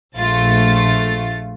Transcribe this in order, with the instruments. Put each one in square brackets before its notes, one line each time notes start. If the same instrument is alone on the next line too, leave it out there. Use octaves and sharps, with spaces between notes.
[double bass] A#1 [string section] A3 F4 A6